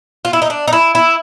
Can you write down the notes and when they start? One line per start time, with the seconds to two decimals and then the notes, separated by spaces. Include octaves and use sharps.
0.25 F4
0.33 E4
0.42 D#4
0.50 D4
0.68 D#4
0.73 E4
0.95 E4